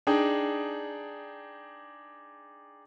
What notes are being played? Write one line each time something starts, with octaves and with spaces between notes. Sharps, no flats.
D4 D#4 G#4 G5